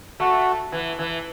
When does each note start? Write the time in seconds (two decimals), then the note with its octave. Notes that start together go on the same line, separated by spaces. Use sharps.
0.20 A3 F#4
0.72 E3
0.99 E3